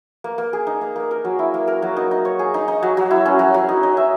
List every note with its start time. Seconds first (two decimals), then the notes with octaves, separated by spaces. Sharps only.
0.24 A#3
0.38 A#3
0.53 G#4
0.67 D#4
0.81 A#3
0.96 A#3
1.11 A#4
1.25 F#3
1.39 E4
1.54 A#3
1.68 A#4
1.82 F#3
1.97 D#4
2.11 D#4
2.25 C#5
2.39 G#4
2.54 D#4
2.68 D#4
2.83 F#3
2.97 F#3
3.11 E4
3.26 C#4
3.39 F#3
3.54 F#3
3.69 D#4
3.83 D#4
3.97 E5